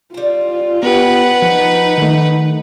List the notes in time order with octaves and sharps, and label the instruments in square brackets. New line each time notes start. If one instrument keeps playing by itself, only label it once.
[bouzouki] G3 C4 [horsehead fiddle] F4
[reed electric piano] B3 G4 [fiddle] B4 F#5
[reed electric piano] F3 [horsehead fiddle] D#4
[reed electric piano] D#3 A3